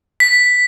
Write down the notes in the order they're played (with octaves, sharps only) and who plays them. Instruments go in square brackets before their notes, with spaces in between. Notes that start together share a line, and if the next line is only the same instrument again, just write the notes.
[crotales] B6